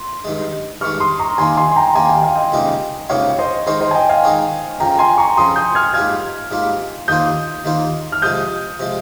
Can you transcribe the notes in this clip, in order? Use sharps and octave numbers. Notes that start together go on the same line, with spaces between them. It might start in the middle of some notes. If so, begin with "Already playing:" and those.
Already playing: C6
G2 D#3 G#3
G2 D#3 G#3 C#6 F6
C6 D#6
A#5 C#6
D#2 D#3 A#3 G#5 C6
G#5 C6
C6
G5 A#5
D#2 D#3 A#3 G#5
G5
F5
D#5 G5
C#2 C3 G3 A#3 D#4
C#2 C3 G3 A#3 D#4 C#5 F5
C5 D#5
D#3 G#3 D#4 A#4 C5 C#5
C5 D#5
G#5
D#5 G5
F5 G#5
D#3 G#3 D#4 A#4 C#5
F2 C#3 F3 G5 A#5
G#5 C6
A#5 C#6
F2 C#3 F3 C6 D#6
D#6 G6
F6 G#6
G#2 G3 A#3 F4 F6 G#6
G#2 G3 A#3 F4
D#2 D#3 A#3 F4 C5 D#6 G6
D#2 D#3 A#3 F4 C5
F6
C3 F3 G#3 D#6 G6
C3 F3 G#3